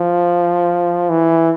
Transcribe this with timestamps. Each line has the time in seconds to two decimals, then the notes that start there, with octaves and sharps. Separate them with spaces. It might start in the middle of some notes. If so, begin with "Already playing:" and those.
Already playing: F3
1.09 E3